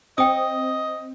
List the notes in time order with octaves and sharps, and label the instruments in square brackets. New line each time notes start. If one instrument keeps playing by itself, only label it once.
[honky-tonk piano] C4 [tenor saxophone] D#5 [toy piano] G5 D#6